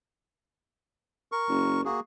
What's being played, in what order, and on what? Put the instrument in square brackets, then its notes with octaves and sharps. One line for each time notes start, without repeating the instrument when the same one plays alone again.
[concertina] A#4 C#6
[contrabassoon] F#1
[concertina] A#3 F#4 G#4